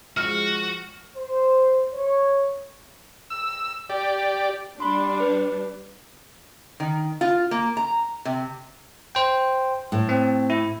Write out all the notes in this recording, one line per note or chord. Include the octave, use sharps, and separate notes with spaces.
F3 G#3 F#4 F6
C5
C#5
E6
G4 D5
G3 D4 B5 C6
B4
D#3
F4
A#3
A#5
C3
C5 G5
A2
C4
E4